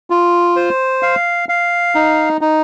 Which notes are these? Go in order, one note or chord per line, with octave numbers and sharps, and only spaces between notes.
F4
C5
F5
F5
D#4
D#4